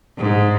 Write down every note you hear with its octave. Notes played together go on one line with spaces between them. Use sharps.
G#2